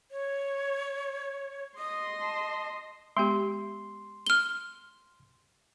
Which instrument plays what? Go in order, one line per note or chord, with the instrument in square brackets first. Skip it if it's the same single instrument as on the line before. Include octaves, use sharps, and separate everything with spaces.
[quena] C#5
[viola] D#5 C6 [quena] D#6
[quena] A5
[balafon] G#3 B3 G4 [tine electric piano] C6
[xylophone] F6 G7